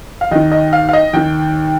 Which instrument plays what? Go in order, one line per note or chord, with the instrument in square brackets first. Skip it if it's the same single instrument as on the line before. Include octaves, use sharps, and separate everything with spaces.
[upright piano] F5
D#2 D#3 D#5
D#5
F5
F5
D#5
D#2 D#3 G5